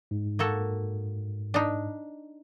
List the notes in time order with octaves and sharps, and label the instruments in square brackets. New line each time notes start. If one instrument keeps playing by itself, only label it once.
[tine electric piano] G#2
[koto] A#3 F#4 A4
D4 D#4